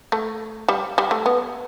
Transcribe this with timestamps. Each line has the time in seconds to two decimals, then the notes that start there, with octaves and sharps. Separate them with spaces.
0.12 A3
0.69 G3
0.98 G3
1.11 A3
1.26 B3